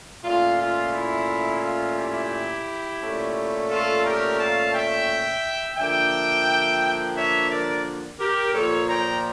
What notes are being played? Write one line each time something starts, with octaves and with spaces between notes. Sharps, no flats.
A#2 A3 C#4 F4
F4
E4
F4
E4 G4
A#2 A3 C#4
F4 A4
G4 A#4
F5 A5
E5 G5
D3 F3 A#3 D4 E5 G5
C#5 E5
A#4 D5
G4 A#4
A#2 F3 A#3 A4 C#5
G5 A#5